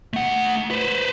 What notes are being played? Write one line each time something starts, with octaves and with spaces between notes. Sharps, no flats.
A3 F#5
B4 C5